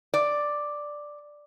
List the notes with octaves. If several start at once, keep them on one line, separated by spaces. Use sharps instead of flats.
D5